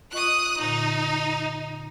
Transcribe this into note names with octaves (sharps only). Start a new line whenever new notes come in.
F4 D#5 C#6 D#6 F#6
A#2 D3 D#4